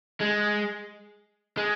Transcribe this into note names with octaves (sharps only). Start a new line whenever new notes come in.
G#3
G#3